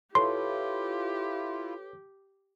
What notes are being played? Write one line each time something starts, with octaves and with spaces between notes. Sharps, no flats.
E4 F4 G4 A4 B4 C#5 C6